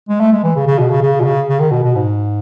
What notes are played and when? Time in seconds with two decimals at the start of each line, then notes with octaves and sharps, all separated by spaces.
0.09 G#3
0.20 A3
0.32 G#3
0.43 E3
0.56 C#3
0.67 C#3
0.78 B2
0.90 C#3
1.03 C#3
1.20 B2
1.25 C#3
1.49 C#3
1.60 D#3
1.71 B2
1.84 B2
1.95 G#2